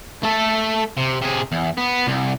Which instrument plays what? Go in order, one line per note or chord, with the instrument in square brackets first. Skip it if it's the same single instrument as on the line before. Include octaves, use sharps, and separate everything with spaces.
[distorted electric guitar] A3 A4
C3
C3 G#4
E2
B3
C2